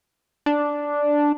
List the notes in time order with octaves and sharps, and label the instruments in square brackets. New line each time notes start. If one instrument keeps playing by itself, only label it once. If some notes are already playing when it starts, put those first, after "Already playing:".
[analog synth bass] D4